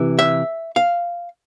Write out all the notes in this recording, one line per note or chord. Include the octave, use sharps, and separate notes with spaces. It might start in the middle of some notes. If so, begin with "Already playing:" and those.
Already playing: C3 E3
E5
F5